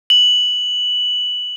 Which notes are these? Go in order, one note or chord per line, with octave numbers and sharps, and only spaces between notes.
F#7